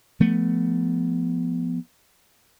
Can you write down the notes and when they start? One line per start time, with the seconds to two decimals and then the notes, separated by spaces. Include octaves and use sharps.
0.20 F3 A3 B3